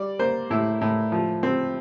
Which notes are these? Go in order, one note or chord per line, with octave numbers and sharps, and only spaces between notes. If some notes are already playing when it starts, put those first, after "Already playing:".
Already playing: G3 D5
A#3 C5
A2 E4
A2
F3
C4